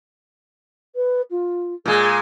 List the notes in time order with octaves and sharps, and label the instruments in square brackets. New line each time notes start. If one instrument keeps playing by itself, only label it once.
[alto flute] B4
F4
[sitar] A#2 G#3 [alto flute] G#4